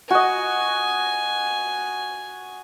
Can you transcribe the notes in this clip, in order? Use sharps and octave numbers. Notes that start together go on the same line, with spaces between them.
F#4 D#5 G#5